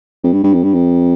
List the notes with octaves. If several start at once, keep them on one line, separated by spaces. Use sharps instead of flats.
F2
G2
G2
F2
G2
F2